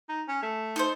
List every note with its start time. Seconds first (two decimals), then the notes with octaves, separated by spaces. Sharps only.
0.09 D#4
0.28 C#4
0.42 A3
0.76 D#4 A4 C5